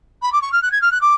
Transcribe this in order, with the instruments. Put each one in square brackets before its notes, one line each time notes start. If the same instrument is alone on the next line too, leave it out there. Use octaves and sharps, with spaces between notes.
[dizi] B5
D6
C#6
F6
F#6
G#6
F6
F#6
D6